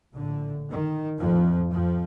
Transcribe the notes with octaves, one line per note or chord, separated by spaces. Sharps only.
A#1 A2 D3
D#3
A#1 F2 A2 F3
F2 F3